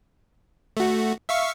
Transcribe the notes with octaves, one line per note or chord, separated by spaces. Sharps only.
A3 F#4
E5 F5 C#6